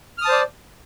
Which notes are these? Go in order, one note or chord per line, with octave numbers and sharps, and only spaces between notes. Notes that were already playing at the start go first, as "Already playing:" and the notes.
C5 D5 A5 D#6 F6